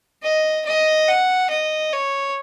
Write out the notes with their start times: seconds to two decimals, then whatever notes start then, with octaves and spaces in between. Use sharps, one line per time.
0.23 D#5
0.65 D#5
1.08 F#5
1.50 D#5
1.92 C#5